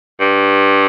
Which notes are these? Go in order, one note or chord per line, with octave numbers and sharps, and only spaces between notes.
G2